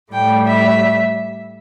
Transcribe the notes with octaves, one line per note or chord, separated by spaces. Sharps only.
A2 G3 G5
E5